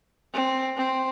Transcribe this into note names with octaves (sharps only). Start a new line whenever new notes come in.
C4
C4